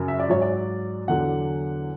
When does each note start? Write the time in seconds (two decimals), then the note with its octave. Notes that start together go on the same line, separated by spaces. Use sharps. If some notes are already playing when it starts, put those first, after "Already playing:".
Already playing: F#2 C#3 F#3
0.08 E5
0.19 D5
0.29 G#2 F#3 C#5
0.42 D5
1.08 E2 D3 F#3 F#5